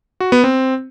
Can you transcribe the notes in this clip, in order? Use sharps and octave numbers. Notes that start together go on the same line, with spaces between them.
F#4
B3
C4